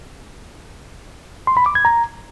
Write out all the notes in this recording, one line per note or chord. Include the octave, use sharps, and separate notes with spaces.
C6
B5
D6
G#6
A#5